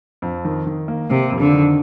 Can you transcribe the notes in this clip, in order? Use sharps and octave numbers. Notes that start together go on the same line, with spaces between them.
F2
D#3
D#3
A#3
C3 A#3
F2
D3
D#3